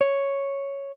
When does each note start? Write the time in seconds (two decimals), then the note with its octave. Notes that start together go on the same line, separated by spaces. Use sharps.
0.01 C#5